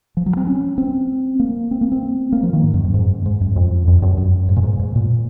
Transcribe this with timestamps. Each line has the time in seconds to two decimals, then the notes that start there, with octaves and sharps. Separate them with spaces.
0.17 F3
0.26 F#3
0.37 C4
0.47 C#4
0.78 C4
1.39 A#3
1.71 C4
1.81 A#3
1.92 C4
2.32 A#3
2.43 F3
2.53 D#3
2.63 G#2
2.74 F#2
2.84 F#2
2.94 G#2
3.26 G#2
3.41 F#2
3.56 F2
3.87 F2
4.02 F#2
4.18 F#2
4.49 G#2
4.56 A#2
4.63 G#2
4.79 G#2
4.96 A#2